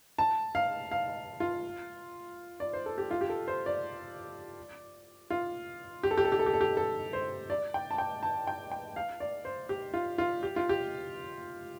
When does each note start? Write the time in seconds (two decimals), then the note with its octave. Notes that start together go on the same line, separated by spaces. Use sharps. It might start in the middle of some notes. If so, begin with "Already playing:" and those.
0.18 A5
0.55 F5
0.91 F5
1.40 F4
2.60 D5
2.73 C5
2.86 A4
2.98 G4
3.11 F4
3.21 G4
3.29 A4
3.48 C5
3.66 D5
5.30 F4
6.03 G4
6.11 A4
6.18 G4
6.25 A4
6.32 G4
6.39 A4
6.46 G4
6.53 A4
6.61 G4
6.77 A4
7.13 C5
7.50 D5
7.74 G5
7.91 A5
7.98 G5
8.23 A5
8.47 G5
8.71 G5
8.96 F5
9.20 D5
9.45 C5
9.69 G4
9.94 F4
10.18 F4
10.43 G4
10.56 F4
10.69 G4